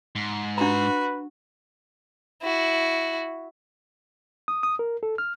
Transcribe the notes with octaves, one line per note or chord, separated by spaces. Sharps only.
G#2
D4 F#4 B4 A#5
E4 F#4
D#6
D#6
A#4
A4
F6